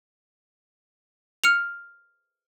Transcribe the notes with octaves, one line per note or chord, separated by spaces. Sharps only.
F6 C#7 F7